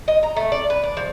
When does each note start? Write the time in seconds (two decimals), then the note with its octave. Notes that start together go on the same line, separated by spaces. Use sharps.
0.08 D#5
0.23 A#5
0.36 A3
0.52 D5
0.70 B4
0.84 D4
0.97 F3